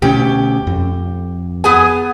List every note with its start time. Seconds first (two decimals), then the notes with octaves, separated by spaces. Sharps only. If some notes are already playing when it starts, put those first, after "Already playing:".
0.02 D2 B2 C#4 G4
0.67 F2
1.64 B3 G#4 G#5